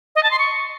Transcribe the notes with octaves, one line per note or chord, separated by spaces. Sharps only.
D#5
A5
C6
C#6